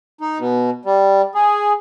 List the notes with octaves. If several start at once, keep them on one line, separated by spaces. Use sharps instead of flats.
D#4
B2
G3
G#4